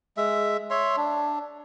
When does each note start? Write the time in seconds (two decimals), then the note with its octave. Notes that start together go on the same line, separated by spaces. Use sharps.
0.17 G#3 E5
0.70 C#5 E5 C6
0.97 D4